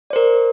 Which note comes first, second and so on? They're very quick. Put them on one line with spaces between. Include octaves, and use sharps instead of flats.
D5 C5 A#4